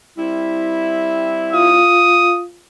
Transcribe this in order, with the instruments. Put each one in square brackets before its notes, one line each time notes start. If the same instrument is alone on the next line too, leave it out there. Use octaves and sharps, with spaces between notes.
[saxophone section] G3 C4 E4
[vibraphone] F4 F5 [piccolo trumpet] D#6